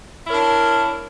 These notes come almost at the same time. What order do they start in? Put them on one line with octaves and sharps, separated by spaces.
E4 C#5 A#4 D4